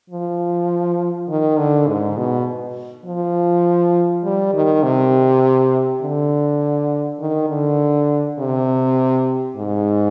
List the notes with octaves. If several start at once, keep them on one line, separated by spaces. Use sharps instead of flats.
F3
D#3
D3
G#2
B2
F3
G3
D#3
C3
D3
D#3
D3
C3
G#2